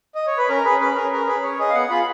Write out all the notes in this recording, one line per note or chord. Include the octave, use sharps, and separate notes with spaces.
D#5
C#5
B4
C#4 A#4
G#4 B4
C#4 B4
G#4 A#4
C#4 A#4
G#4 B4
C#4 C#5
G#4 D#5
F5
B3 F#5
F4 G#4 B5